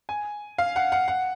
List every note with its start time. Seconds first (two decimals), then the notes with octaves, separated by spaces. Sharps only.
0.09 G#5
0.58 F5
0.76 F#5
0.92 F#5
1.08 F#5